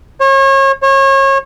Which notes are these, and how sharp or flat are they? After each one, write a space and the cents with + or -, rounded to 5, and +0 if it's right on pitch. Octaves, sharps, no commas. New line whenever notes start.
C#5 -35
C#5 -30